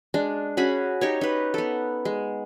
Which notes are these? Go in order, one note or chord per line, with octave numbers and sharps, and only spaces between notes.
G#3 D4
C#4 F#4 G#4 B5
D#4 G4 C#5
D#4 B4
B3 A4
G#3